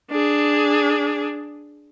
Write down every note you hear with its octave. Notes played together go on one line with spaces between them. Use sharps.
D4 G#4